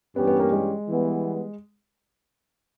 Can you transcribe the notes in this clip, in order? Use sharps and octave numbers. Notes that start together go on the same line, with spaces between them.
G2 E3 G3 B3 C#4 G4
B3
A#3
G#3
E3 G3 B3